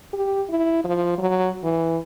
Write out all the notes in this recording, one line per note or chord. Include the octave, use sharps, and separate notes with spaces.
G4
E4
F3
F#3
E3